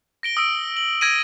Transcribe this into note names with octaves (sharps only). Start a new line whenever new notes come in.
A#6 D7 G7
D#6 E6 D7
F#7
E6 G#6 A#6 D7 D#7